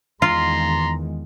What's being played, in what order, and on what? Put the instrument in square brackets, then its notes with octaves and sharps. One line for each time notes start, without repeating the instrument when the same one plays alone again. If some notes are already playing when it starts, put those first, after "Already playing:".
[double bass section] E2 D#3 G#3 [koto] F4 [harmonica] A#5 C6